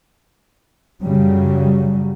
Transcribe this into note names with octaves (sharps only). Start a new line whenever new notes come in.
F#2 C#3 F#3 G3